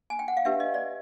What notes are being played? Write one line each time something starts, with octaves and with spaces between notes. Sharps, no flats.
G#5
G5
F#5
F5
D4 G4 B4 E5
D#5
D5